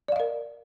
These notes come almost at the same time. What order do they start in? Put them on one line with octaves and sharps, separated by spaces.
D5 F5 D#5 A#4